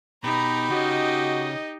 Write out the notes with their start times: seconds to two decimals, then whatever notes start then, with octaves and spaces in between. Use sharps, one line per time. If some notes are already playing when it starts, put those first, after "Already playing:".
0.24 B2 D#4 G4 A#5 B5
0.70 C#3 F#4 D#5